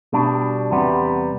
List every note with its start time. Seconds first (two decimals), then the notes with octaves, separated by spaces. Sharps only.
0.13 B2 G3 D4
0.71 E2 C3 G3 B3